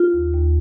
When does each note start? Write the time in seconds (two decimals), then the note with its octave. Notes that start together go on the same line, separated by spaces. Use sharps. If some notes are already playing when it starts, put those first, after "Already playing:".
Already playing: F4
0.13 D#2
0.34 D#2